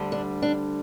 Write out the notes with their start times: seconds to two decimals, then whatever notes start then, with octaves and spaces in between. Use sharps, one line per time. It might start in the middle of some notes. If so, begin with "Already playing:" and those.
Already playing: D2 D3 G3
0.12 D4
0.42 D4